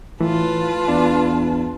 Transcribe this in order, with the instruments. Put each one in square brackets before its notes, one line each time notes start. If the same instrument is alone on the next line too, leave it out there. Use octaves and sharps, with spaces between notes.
[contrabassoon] A2 [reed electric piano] E3 [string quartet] F4 B4 A5
[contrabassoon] E2 [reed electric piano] D4